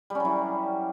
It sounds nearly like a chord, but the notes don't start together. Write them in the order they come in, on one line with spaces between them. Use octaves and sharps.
G3 C#4 F#3 E3